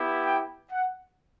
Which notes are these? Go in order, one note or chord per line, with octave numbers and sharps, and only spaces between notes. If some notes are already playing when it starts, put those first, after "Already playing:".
Already playing: B3 E4 G4
G5
F#5